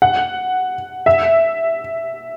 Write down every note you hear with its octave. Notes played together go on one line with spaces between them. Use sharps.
F#5
E5